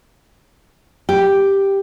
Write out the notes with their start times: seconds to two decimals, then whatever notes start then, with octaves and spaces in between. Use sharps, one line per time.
1.09 G4